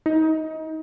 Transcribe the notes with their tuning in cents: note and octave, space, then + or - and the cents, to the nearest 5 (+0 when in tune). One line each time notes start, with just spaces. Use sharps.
D#4 +25